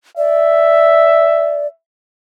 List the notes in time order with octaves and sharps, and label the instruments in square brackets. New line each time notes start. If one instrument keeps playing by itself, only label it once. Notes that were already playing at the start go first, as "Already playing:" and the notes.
[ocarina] D5 [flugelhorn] E5